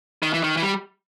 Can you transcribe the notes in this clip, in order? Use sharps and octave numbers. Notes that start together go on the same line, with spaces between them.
D#3
E3
D#3
E3
G3